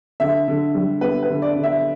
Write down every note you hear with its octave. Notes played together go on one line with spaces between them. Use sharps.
D3 E5
D3
G3
B3 B4
B4
D3
D5
D3
E5